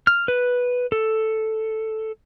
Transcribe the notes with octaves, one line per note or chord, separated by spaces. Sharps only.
F6
B4
A4